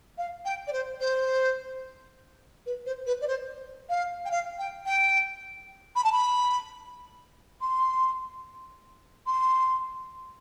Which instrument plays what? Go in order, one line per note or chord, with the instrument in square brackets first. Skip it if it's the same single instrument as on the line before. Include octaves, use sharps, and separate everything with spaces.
[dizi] F5
G5
D5
C5
C5
B4
C5
B4
D5
C5
F5
G5
F5
G5
G5
B5
A5
B5
C6
C6